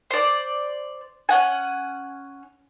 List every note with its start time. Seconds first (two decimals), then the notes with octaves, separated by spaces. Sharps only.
0.11 C5 D5
1.29 C#4 F#5 G#5